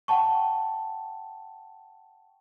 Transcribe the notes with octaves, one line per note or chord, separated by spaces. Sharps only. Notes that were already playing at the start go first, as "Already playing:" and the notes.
F#5 G5 A5 C#6